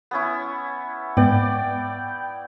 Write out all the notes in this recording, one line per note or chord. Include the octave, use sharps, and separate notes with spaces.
B3 C#4 E4
G#2 B3 D5 G5